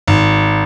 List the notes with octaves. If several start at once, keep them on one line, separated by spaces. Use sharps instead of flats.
G#1